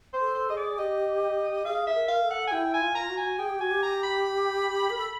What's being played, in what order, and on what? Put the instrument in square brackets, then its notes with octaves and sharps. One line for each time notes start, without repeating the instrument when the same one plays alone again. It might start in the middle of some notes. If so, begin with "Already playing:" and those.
[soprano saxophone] C5
[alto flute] A4
[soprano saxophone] C5
[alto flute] G#4 [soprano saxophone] D#5
[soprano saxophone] D5
[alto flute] G4 [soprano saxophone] D#5
[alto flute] G#4 [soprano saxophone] F5
[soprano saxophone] E5
[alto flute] A#4
[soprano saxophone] F5
[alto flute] A4
[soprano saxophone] F#5
G#5
[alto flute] E4 [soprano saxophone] G5
[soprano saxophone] G#5
[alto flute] F4
[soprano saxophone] A#5
[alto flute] F#4
[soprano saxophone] G#5
[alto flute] G#4 [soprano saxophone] G5
[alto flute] G4
[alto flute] F#4 [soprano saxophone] G#5
[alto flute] G4
[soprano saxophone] A#5
B5
[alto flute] A#4
A4